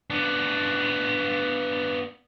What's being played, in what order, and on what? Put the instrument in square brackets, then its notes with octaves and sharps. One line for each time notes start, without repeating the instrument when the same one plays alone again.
[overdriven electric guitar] B3 D4